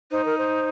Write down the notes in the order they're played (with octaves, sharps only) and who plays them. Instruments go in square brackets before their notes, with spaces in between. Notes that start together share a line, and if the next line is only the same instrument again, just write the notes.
[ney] D#4 [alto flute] C5
[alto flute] A#4
C5